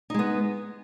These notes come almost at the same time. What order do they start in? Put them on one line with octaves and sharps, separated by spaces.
D#4 G#3 B3